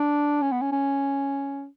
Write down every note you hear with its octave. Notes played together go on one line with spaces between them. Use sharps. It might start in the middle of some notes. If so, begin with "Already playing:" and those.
Already playing: D4
C#4
B3
C#4
C#4